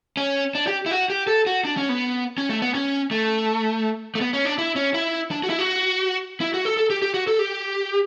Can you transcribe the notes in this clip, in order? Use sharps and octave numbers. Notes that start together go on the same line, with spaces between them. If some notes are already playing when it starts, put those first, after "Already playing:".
C#4
D4
G4
E4
F#4
G4
A4
F#4
D4
C#4
B3
C#4
A3
B3
C#4
A3
A3
B3
C#4
D4
E4
C#4
E4
D4
F#4
E4
F#4
E4
F#4
A4
A4
G4
G4
F#4
A4
G4